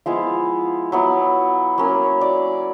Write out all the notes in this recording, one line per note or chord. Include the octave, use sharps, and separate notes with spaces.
F3 G#3 B3 E4 F5
F#3 B3 E4
F#3 A#3 C#4
D5